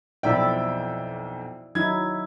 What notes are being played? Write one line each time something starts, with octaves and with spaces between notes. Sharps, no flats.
B1 F2 E4 D5 E5 G5
F#3 D#4 E4 G#6